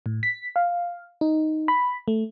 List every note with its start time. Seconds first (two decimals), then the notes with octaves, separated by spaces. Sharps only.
0.06 A2
0.23 B6
0.56 F5
1.21 D#4
1.68 B5
2.08 A3